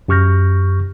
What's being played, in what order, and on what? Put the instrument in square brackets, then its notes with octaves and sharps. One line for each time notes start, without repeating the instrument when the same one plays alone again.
[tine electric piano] F#2 G4 C#6 F6 G6 A#6